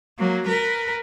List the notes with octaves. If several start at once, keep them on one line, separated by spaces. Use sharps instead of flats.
F#3 A#3
A#4 B4